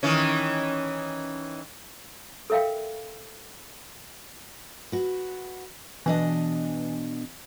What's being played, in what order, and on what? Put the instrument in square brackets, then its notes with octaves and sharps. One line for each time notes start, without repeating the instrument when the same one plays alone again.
[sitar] D#3 E3 C#4
[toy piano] A4 A#4 E5 F5 G5
[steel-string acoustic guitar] F#4 B4
[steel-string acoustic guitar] B2 D4 D#5 [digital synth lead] E3